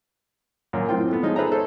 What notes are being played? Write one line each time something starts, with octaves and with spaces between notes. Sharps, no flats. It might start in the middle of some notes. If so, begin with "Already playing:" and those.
F#2 A#2 A#3 C#4
A2 C4 F4 G5
A3 B3
F3 G#3 C#4 D#4
G#4 A4 B4 C5 E5 A#5
A4 C5 C#5